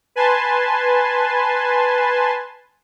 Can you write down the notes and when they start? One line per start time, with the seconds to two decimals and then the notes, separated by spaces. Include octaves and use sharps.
0.16 B4 G#5 A5 C6